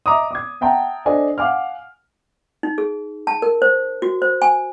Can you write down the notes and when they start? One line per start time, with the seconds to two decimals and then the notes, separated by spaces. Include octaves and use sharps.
0.06 D#5 E5 A#5 D6 D#6
0.31 D6 G#6
0.61 E5 F#5 G5 A5 A#5
1.05 D4 A4 C5 D#5 G#5
1.38 F5 F#5 G#5 D6 F6
2.63 D#4
2.78 G#4
3.27 A5
3.42 A#4
3.62 C5
4.02 F#4
4.22 C5
4.42 G#5